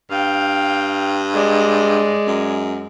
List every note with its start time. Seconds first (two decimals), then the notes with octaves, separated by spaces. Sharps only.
0.10 G2 F5 G5
1.34 G#3 D5
2.27 F#2